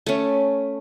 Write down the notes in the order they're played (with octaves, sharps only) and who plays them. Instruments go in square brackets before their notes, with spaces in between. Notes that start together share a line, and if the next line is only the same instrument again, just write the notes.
[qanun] A3 C#4